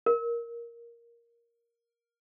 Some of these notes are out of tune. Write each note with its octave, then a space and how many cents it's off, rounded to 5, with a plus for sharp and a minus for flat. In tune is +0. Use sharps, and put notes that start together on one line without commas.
A#4 +5